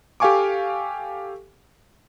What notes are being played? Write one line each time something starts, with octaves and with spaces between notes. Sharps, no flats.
G4 A4 F5 G#5 C#6 D6